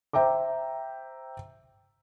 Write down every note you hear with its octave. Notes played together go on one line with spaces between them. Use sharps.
C5 E5 G5 A#5 D6